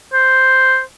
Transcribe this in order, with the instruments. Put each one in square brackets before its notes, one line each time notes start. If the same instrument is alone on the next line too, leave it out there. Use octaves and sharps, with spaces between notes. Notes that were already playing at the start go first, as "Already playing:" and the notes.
[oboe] C5